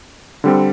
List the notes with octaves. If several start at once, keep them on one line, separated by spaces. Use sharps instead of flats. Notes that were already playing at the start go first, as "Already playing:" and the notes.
D3 G3 C4